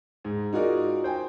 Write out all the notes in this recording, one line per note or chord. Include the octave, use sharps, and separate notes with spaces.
G#2
D#4 F4 F#4 G#4 A#4 D5
C5 G5 G#5